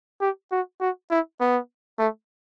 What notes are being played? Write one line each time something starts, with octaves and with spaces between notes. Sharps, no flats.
G4
F#4
F#4
E4
B3
A3